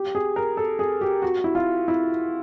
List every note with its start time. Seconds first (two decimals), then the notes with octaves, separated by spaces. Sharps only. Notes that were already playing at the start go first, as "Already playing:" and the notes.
Already playing: G4
0.15 G#4
0.36 A#4
0.57 A4
0.79 G#4
1.01 G4
1.22 F#4
1.44 E4
1.55 F4
1.88 E4